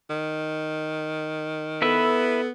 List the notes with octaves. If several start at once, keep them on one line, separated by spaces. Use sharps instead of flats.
D#3
B3 E4 A4 B4 E5